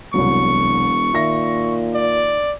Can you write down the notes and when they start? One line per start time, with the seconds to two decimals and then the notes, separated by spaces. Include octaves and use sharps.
0.14 E1 C2 F#3 C#6
1.14 A#2 D#3 E5 A#6
1.94 D5